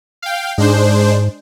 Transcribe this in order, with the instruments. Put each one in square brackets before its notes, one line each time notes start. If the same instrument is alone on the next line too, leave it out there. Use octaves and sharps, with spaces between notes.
[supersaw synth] F5 G5
[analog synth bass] G#2 [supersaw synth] G#3 D4 C5